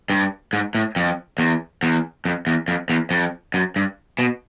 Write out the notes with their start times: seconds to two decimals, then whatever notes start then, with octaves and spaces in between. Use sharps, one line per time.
0.10 G2
0.53 G#2
0.75 A2
0.96 F2
1.39 E2
1.83 E2
2.25 F2
2.47 E2
2.68 F2
2.90 E2
3.11 F2
3.54 F#2
3.76 G2
4.19 B2